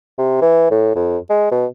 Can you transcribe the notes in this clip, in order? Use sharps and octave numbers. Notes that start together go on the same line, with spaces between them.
C3
E3
A2
F2
G#3
B2